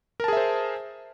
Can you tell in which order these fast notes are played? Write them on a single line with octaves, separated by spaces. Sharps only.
A#4 A5 G#4 E5 C5